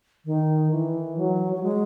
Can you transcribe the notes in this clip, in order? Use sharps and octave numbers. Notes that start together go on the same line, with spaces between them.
D#3
E3
F#3
F#3
G#3